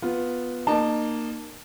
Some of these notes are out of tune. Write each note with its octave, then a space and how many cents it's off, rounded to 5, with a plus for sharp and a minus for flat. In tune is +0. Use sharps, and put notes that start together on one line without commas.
B3 +0 F4 +10
A#3 +0 D#4 -35 A5 +0